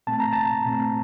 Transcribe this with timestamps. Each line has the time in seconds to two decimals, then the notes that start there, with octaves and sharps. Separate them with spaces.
0.07 A#2 A3 C4 A5
0.20 A#5
0.33 A5
0.66 A#2 A3 C4